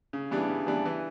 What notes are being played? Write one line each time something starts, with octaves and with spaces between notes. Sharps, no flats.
C#3
E3 G3 B3 D4
C#3
E3 G3 B3 D4
E3